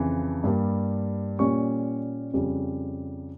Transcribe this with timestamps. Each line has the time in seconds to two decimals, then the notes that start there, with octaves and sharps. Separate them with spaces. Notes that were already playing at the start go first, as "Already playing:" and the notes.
Already playing: F2 C#3 E3
0.44 G2 G3 A#3
1.39 A#2 G3 C#4 C#6
2.33 F2 C#3 G3 C#4